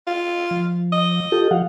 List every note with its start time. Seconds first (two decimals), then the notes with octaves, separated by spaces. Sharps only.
0.07 F4
0.51 F3
0.92 D#5
1.32 F4 G4 A4
1.51 F3 F5 F#5